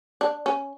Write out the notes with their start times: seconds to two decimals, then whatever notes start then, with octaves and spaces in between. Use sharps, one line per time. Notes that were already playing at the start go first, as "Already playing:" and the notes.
0.21 D4
0.46 C#4